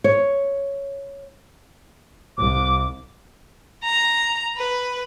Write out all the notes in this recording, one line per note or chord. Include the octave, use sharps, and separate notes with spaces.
C#5
C2 D6
A#5
B4